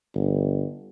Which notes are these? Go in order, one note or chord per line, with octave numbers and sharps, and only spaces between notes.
G1